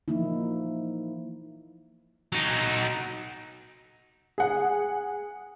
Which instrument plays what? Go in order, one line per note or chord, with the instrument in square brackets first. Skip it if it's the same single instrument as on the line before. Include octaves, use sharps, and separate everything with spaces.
[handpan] E3 F3 A#3 D#4 E4
[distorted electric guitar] F#3 D#4
[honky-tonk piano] G#4 F#5